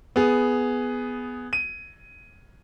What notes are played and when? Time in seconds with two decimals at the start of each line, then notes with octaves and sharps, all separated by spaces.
0.16 B3 G#4
1.53 D#7